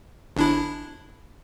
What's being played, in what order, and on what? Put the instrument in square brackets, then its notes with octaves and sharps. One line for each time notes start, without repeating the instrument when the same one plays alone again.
[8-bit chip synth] G1 D4 E4